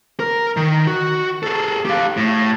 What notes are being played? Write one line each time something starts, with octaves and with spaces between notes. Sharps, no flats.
A#4
D#3
F#4
G#4 A4
G4 F5
A2